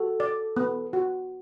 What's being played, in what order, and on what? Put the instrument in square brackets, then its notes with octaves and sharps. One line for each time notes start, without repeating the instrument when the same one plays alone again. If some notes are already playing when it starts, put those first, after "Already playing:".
Already playing: [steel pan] F#4 [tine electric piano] A4
[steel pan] D5
B3
F#4